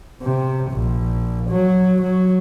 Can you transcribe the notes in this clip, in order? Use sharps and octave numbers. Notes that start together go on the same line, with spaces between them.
C3
A#1
F#3
F#3